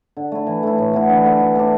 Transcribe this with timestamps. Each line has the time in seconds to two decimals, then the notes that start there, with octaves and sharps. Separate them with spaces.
0.17 D3
0.32 A3 E4
0.47 E3
0.63 A3 E4
0.78 A2
0.93 E3 B3 E4
1.09 D3
1.25 A3 E4
1.40 E3
1.55 A3 D4